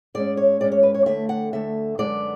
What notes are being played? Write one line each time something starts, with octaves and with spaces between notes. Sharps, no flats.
G#2 G#3 C#4 D5
C#5
G#2 G#3 C#4 D5
C#5
B4
C#5
D2 D3 A3 E5
F#5
D2 D3 A3 E5
F#2 D3 G#3 B3 D5